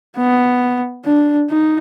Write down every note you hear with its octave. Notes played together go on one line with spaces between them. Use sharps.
B3
D4
D#4